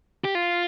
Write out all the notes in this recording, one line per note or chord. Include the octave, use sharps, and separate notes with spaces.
G4
F4